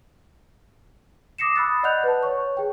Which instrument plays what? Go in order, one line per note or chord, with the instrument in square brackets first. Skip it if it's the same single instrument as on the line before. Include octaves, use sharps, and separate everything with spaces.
[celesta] D6 D#6 A#6 C7 C#7 E7
B5 D#6 E6 F#6 A6
D5 D#5 F#5 F#6 G6 F7
B4 A5
C#5 C#6
G#4 G5